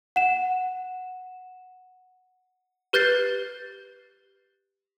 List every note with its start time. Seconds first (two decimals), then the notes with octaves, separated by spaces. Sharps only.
0.16 F#5 E7
2.93 G4 B4 F#6 G6 A6 C7